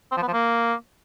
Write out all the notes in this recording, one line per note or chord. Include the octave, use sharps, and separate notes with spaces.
C4
F3
B3
F3
A#3